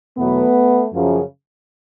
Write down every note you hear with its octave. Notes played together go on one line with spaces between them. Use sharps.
E2 B2 F#3 A3 B3
F#2 C#3 F3